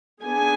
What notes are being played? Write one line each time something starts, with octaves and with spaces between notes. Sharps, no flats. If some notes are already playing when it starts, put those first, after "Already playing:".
B3 D4 G#4 G#5